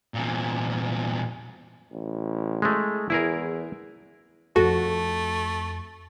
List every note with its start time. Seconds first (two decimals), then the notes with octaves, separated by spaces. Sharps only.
0.14 E2 A#2
1.92 A1
2.62 G#3 A3
3.10 E2 E4 G#4 A#4
4.56 F2 A3 D#4 F#4 A4